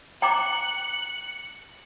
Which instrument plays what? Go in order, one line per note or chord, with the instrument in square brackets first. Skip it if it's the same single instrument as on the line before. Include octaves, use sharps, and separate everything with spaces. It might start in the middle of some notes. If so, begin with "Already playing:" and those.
[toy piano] G5 A#5 D6 [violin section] F#6 C#7